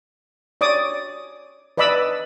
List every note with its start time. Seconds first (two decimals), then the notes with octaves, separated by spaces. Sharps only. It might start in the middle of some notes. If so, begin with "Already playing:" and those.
0.61 C#5 D5 D6 D#6
1.78 B4 D5 D#5 B5 D6 E6